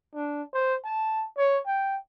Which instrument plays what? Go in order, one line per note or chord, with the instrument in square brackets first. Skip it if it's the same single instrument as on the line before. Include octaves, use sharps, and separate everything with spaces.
[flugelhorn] D4
C5
A5
C#5
G5